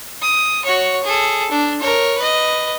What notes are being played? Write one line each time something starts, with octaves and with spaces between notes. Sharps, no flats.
D#6
F#4 C#5
G#4 A4
D4
A#4 C#5
B4 D#5